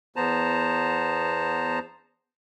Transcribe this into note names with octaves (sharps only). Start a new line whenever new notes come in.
E2 B3 C5 A5 A#5